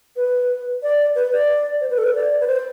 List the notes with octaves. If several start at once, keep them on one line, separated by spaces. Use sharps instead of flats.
B4
D5
B4
D5
C5
B4
A4
B4
D5
B4
C5